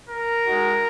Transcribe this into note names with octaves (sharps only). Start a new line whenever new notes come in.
A#4
G#3 D#4 F#4